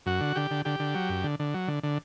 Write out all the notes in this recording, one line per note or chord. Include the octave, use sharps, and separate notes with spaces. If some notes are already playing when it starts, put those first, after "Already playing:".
F#2 F#4
D3
D3 G4
D3
D3 G4
D3
F#3
F#2
D3
D3
F#3
D3
D3